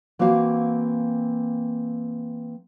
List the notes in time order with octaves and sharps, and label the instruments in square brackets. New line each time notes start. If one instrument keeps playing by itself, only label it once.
[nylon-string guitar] E3 A#3 C4 F#4 F5